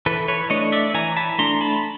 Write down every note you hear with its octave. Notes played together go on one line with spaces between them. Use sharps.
E3 A4 B4
B4 C#5
A3 D4 C#5 D#5
D5 E5
E3 G#5 A#5
A5 B5
A3 D4 A#5 C6
A5 B5